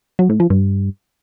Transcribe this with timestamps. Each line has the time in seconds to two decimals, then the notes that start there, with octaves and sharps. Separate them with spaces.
0.19 F#3
0.29 A2
0.40 F3
0.50 G2